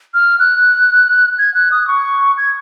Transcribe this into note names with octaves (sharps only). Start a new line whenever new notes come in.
F6
F#6
G#6
F#6
D#6
D#6
C#6
G#6